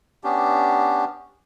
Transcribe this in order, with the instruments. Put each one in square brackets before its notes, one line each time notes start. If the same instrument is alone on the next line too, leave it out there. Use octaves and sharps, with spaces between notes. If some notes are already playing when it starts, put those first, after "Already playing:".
[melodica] B3 C#4 D4 G4